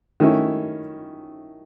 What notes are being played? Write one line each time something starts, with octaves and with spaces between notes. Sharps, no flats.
D#3 A3 C#4 E4